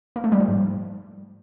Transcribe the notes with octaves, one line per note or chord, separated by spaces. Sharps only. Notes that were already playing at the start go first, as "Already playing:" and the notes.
A#3
A3
G3
F3
G#2